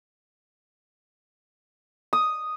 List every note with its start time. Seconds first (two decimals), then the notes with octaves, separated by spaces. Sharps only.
2.13 D#6